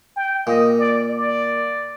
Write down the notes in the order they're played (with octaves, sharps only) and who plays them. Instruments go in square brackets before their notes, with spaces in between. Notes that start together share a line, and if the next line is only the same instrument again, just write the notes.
[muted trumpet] G5
[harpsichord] A#2 [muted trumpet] D#5
[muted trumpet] D5
D5